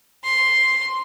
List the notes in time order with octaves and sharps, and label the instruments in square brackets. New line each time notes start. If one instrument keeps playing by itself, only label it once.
[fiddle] C6